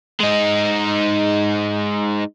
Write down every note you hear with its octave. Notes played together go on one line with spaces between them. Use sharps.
G#3 D#4